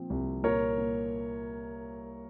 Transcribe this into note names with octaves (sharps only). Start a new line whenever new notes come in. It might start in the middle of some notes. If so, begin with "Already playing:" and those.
Already playing: A#2 F3 C4
C2
A#2 A#4 C#5
A#2